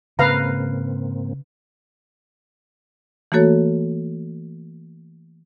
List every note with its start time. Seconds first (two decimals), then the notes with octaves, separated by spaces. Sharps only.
0.19 G#2 C#3 A#3 C4 B4 F5 A#5
3.32 E3 A3 A#3 F#4 A4 C#5